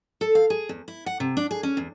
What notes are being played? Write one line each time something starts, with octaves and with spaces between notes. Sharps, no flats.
A4
F5
G#4
E2
E4
F#5
C3
D4
G#4
C#4
E2